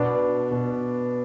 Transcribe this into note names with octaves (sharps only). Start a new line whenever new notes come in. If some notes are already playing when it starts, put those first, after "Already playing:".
Already playing: B2 B3 D4
B2